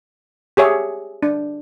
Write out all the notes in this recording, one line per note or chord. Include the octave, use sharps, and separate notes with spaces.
G4 G#4 C#5 E5
D4